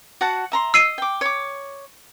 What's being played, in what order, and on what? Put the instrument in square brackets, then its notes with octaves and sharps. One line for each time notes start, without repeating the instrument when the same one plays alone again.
[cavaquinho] F#4 F#5 A5
E5 A#5 C6
[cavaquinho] D#5 [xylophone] E6 C7 D#7
[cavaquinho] G5 D6
C#5 D6